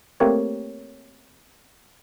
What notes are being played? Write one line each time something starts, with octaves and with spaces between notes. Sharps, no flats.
A3 A#3 C4 G4 A#4 C#5